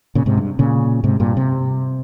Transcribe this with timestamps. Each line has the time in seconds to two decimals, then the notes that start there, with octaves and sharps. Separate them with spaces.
0.15 A#2 C#3
0.26 G#2 C3
0.38 G2
0.59 A#2 C#3
1.04 G#2 C3
1.20 G2 A#2
1.37 C3